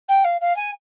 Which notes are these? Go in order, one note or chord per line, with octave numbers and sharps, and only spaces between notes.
G5
F5
F5
G#5